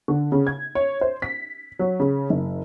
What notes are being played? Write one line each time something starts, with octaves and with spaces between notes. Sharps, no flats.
D3
C#3
G#6
C#5
C5
B6
F#3
C#3
F#1